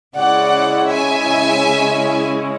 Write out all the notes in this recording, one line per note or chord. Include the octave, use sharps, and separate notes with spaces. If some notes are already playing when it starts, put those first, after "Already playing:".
C#3 G#3 C#4 E4 D5 F#5
E5 G#5